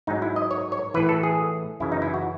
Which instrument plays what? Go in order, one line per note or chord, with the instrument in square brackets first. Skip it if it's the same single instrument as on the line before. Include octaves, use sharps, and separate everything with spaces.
[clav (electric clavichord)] G#2 F#3 D#4
E4
D#5
C#5
C#5
E3 B4
A2
A4
G#4
F#2 C#3 E3 E4
D#4
E4
F#4